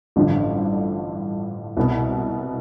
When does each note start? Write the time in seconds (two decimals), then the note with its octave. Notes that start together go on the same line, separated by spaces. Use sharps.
0.16 A1 G2 D3 F3
1.77 C2 B2 B3